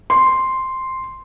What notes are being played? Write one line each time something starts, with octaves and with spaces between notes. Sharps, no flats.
C6